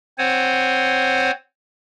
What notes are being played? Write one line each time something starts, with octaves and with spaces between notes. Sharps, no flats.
C4 C5 C#5 F#5 G#5